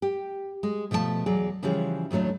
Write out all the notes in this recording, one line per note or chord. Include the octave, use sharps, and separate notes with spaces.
G4
G#3
B2 F3 A3 C#5 A5
E2 F#3 G#4 D5
C#3 E3 F3 G3 F#4 G#4
D#2 A2 F#3 A3 D4